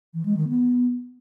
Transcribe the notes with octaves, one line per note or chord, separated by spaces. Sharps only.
E3
G#3
D#3
B3